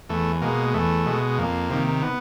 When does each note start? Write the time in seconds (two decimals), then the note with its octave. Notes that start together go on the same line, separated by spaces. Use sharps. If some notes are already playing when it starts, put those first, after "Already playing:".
0.09 E2 A3
0.42 B2 G#3 A#3
0.74 E2 A3
1.06 B2 G#3
1.38 F2 A#3
1.70 C3 D#3
2.02 B3